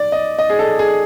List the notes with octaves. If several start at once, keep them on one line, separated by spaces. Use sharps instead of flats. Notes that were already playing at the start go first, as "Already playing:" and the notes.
Already playing: D5
D#5
D#5
G#4
A4
G#4